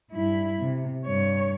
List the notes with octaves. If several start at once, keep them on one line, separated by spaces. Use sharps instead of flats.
G2 E4
C3
G2 C#5